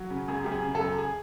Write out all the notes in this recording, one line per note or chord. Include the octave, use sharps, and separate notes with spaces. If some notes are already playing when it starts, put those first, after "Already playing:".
Already playing: F#3
C#3
F#2 G#4
F#2 G4
G#4
C#3
A4
F#2
G#4